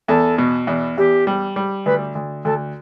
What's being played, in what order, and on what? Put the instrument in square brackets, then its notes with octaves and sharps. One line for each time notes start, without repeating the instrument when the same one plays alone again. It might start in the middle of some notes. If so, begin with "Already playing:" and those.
[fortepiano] E2 [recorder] A4
[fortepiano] B2
E2
[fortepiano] E2 [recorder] G4
[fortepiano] G3
G3
[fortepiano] D2 [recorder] B4
[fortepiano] D2
[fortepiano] D2 [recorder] A4